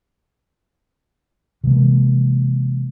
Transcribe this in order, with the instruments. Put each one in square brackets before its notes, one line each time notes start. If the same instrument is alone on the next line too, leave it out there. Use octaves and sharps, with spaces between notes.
[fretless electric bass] C3 E3 G#3 A#3